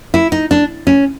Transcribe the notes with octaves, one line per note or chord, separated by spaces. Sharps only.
E4
D#4
D4
C#4